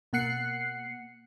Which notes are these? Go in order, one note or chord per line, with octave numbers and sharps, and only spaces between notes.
B2 A#3 F#5 F#6 C7 C#7